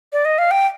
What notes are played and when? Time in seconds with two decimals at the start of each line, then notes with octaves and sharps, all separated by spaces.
0.13 D5
0.25 D#5
0.38 F5
0.51 G5